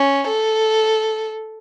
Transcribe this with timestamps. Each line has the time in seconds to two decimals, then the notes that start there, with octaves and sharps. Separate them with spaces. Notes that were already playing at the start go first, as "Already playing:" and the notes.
Already playing: C#4
0.28 A4